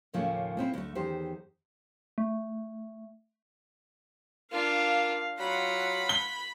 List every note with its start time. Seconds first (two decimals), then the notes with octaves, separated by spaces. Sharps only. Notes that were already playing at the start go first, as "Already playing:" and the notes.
0.13 D#2 A2 C#3 F3 A3 A#3
0.57 A#2 C4 E4
0.74 D2 A3
0.95 E2 D#3 G4 C5
2.18 A3
4.52 A#3 D4 F4 F5
5.39 F#3 F4 F#5 B5
6.09 G7